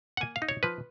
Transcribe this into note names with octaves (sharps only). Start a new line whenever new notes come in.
F#5
A#3 G#5
F5
D#4
C#5
F3 B4